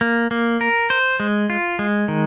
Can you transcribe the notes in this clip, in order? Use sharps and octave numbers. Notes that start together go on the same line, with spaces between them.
A#3
A#3
A#4
C5
G#3
F4
G#3
D#3